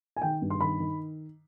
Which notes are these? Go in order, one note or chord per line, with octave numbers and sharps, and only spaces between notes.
G#5
D#3 G5
G2
C6
D#3 B5
D#3